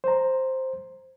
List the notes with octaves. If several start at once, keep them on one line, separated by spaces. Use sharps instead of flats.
C5 A#5